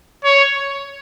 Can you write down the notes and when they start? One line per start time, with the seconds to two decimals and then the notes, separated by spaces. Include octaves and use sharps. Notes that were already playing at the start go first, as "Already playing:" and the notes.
0.24 C#5